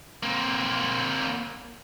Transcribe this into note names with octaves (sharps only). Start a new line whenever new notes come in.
A#3 C4